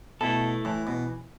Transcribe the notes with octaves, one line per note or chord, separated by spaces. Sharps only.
B2 A3 E4 A4
A2 E3
B2